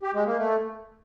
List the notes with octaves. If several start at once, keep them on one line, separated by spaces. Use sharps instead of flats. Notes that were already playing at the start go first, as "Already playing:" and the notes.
G4
G#3
A#3
A3